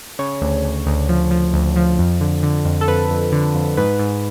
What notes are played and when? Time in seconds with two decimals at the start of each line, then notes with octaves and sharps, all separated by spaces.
0.19 C#3 C#5
0.41 D2
0.64 D2
0.86 D2
1.09 F3
1.31 F3
1.54 D2
1.76 F3
1.98 F2
2.21 D3
2.43 D3
2.65 F2
2.81 A4
2.88 F2 B4
3.10 F2
3.32 D3
3.55 F2
3.77 G#2 B4
3.99 G#2